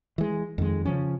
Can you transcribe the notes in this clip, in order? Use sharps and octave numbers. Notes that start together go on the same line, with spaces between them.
E3 G#3
F2 D#3 G#3
C#3 F3 C#4